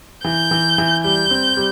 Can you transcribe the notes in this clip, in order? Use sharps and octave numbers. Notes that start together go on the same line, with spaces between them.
E3 G6
E3
E3
G3 G6
C4
G3